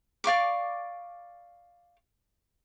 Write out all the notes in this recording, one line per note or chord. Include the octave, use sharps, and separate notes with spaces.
D5 F5 C#6 D6